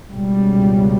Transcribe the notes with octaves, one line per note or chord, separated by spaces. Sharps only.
C#2 B2 G3